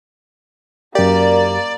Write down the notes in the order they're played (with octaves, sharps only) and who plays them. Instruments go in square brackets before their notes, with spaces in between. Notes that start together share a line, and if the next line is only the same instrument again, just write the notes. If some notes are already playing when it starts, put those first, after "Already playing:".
[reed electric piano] F#2 G4 [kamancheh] A#3 [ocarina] A#4 [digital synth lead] D5